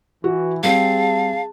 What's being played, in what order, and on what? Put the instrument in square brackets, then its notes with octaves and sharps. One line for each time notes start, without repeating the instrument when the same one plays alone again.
[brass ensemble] E3 [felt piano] F#4
[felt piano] G3 C4 [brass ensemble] G#4 A5 [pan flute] F5